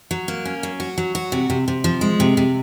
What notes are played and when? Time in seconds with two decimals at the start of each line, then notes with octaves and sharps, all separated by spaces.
0.11 F#3
0.28 A#3
0.45 C#4
0.63 F#3
0.80 F#4
0.98 F#3
1.15 F#4
1.32 C3
1.50 C3
1.68 C3
1.84 F3
2.01 G#3
2.20 C3
2.37 C3